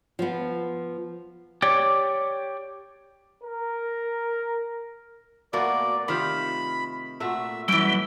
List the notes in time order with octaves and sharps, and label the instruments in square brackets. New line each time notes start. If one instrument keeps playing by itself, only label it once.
[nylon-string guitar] F3 B3
[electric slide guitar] G4 C#5 D5 [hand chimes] D6
[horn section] A#4
[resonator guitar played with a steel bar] B2 A#3 [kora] A3 F#4 [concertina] D5
[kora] C3 F4 G4 [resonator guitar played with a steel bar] D#3 [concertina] B5
[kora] A#2 A3 F#4 [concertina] E5
[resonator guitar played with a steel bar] F#2 E3 [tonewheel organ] G3 [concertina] E6